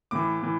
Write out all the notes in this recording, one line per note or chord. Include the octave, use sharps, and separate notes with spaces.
A2 E3 D6
A2 E3